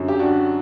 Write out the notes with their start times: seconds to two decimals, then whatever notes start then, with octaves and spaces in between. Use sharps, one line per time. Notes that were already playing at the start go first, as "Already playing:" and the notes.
Already playing: F#2 D3 F#3
0.08 G4
0.19 D4 F#4